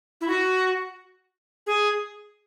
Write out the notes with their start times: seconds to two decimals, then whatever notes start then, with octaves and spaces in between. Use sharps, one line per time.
0.21 E4
0.28 F#4
1.67 G#4